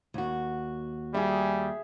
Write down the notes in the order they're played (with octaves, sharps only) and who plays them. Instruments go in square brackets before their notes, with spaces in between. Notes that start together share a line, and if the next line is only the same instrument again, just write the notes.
[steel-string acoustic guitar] D#2 F#4
[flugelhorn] G3 [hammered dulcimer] G#4 E5